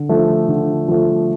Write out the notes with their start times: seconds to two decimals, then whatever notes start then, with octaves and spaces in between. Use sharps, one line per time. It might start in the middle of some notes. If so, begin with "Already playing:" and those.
Already playing: D3
0.09 F3 A3
0.48 D3
0.88 F3 A3